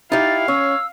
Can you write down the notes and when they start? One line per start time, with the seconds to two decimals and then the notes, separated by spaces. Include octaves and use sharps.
0.12 D#4 E4 G4 F5 A6
0.48 C#4 C#5 E6